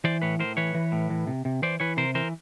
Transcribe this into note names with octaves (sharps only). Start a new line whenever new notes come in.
E3 C5 D5
A2 B4 C#5
A2 A#4 C5
E3 B4 C#5
E3
A2
E3
C3
C3
E3 C5 D5
E3 B4 C#5
C3 A#4 C5
E3 A#4 C5